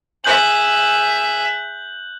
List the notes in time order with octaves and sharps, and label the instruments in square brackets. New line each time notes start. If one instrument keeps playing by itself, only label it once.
[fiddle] G#4 E5 [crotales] F#6 G6 F#7